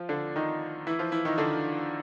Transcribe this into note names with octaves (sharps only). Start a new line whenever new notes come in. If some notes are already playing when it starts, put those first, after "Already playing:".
Already playing: F3 F4
D3 D4
D#3 D#4
E3 E4
F3 F4
E3 E4
D#3 D#4
D3 D4